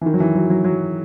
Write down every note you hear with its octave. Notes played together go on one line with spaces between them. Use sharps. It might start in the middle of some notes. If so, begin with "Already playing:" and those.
E3
D#3
F#3
E3
F#3
F#3
F#3